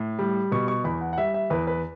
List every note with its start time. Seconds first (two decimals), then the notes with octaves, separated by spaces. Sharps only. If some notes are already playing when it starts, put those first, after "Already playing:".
Already playing: A2
0.19 G3
0.52 B2 C#6
0.68 C#6
0.84 E2 B5
1.01 F#5
1.13 F#5
1.18 G3 E5
1.34 E5
1.50 E2 B4
1.67 B4